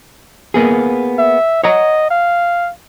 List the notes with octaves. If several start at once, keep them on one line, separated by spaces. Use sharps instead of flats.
A#3 B3 G#4
E5
C#5 D#5 F#5 A#5
F5